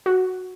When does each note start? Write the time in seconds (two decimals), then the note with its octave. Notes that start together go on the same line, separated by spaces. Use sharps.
0.06 F#4